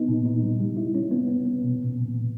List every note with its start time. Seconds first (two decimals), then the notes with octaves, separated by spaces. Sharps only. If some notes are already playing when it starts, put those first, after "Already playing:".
Already playing: B3 D#4
0.08 A#2
0.26 D#4
0.43 G3
0.60 G3
0.77 E4
0.95 C#4
1.11 B3
1.28 B3
1.45 B3
1.62 B2
1.79 A#2
1.97 A#2
2.14 A#2